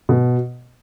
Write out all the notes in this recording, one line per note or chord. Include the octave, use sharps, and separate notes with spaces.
B2